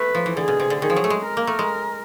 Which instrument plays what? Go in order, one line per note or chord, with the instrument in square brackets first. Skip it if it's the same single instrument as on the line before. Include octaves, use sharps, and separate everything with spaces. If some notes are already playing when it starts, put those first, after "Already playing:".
Already playing: [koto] A3 [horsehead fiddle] B4
[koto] F3
E3
[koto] D3 [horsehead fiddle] G#4
[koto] B2
C3
D3
[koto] D#3 [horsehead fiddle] G#4
[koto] F3
F#3
A3
G#3
[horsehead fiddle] A#4
[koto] A#3
A3
G#3